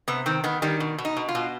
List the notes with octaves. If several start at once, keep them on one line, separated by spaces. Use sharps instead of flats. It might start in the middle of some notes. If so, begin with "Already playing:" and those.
C3 B3
D#3 C4
D#3 B3
D#3 G3
B2
B2
D#4
B2
F4
B2